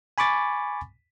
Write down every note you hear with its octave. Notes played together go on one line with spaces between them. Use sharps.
G#5 B5 C#6 D6 A6